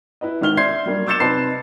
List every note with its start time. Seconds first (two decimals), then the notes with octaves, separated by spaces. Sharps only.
0.21 E4 B4 D#5
0.41 G#1 D#3 F6 G7
0.57 D5 E5 C6 G6 G#6 C7
0.86 F#3 G3 A#3 D4
1.07 D6 E6 G6 A6 C#7 E7
1.20 C3 D#4 B4 A5 C6 C7